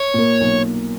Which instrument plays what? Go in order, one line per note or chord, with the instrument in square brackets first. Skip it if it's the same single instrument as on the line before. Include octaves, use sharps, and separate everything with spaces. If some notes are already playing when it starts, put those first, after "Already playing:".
Already playing: [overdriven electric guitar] C#5
[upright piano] A#2 A#3
B1